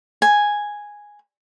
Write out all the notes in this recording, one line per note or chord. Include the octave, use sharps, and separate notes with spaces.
G#5